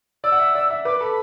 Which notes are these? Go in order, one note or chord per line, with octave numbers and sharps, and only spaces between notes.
D5 E6
F#5
E5
D5
E5
B4 D6
A4 B5